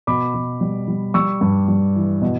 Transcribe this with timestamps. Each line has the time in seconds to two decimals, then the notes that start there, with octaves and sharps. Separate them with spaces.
0.07 B2 B5 D6
0.35 B2
0.61 G3
0.88 G3
1.14 G3 C#6 E6
1.41 G2
1.68 G3
1.96 E3
2.22 B2